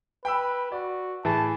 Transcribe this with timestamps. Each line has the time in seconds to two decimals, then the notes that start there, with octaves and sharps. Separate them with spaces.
0.25 B4 G5 B5 E6
0.72 F#4 D5
1.25 A2 E3 G#4 A5